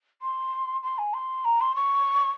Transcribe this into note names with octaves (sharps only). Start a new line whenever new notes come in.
C6
C6
G#5
C6
A#5
C6
C#6